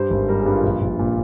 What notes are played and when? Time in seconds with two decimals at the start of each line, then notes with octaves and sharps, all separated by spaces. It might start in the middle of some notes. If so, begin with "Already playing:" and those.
Already playing: G2 G3 C5
0.10 G#1
0.28 G3 A#4
0.40 G#4
0.46 G2
0.52 F4
0.64 A#1
0.81 A#1
0.99 A#2